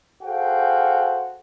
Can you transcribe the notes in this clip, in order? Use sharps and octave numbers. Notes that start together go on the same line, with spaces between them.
F#4 G#4 A4 C5 F5 G5